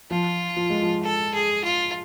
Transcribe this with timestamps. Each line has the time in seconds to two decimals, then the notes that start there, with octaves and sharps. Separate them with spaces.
0.10 F3 F4
0.57 F3
0.70 G#3
0.82 F3
1.03 A4
1.34 G#4
1.64 F4